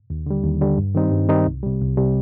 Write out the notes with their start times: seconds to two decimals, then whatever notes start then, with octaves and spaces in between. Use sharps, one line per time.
0.10 D#2
0.26 D3 G3
0.44 D#2
0.61 D3 G3
0.77 G2
0.95 D#3 G3 C4 D#4
1.12 G2
1.29 D#3 G3 C4 D#4
1.46 C2
1.63 C3 G3
1.81 C2
1.97 C3 G3